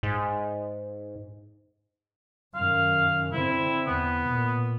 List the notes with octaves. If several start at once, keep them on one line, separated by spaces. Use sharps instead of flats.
G#2
F#2 D#3 F5
D3 C4 E4
E2 B3
A#2